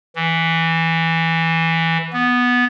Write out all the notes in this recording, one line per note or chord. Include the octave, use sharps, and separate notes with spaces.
E3
B3